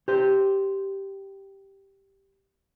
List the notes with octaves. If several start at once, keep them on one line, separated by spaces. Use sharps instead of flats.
G4 C5